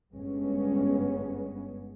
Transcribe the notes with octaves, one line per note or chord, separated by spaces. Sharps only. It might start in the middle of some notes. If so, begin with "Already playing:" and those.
G1 G2 G#3 B3 C#4